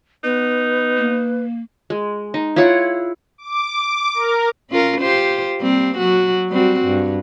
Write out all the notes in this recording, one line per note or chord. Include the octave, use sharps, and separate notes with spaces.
B3 D#4 B4
A#3
G#3
D#4
E4 F4 C#5 F#5
D6
A#4
C#4 F4 A#4
F4 G4 C5
G3 A#3 C4
F#3 F#4
G3 C4 F#4
G2